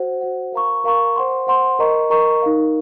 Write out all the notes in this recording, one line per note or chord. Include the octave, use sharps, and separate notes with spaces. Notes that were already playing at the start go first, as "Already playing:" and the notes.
Already playing: F#4 C5 F#5
F#4 C5 F#5
A#4 F5 A#5 C#6
A#4 F5 A#5 C#6
C5 F#5 C6
C5 F#5 C6
A#4 D#5 A#5 C#6
A#4 D#5 A#5 C#6
D#4 A#4 F5